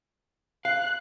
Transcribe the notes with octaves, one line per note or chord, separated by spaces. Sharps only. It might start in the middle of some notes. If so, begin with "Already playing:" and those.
F5 F#6